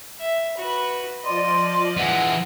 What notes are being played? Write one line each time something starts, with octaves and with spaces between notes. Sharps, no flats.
E5
F#4 B4
F3 D5 D#5 C6
E3 G#3 F#5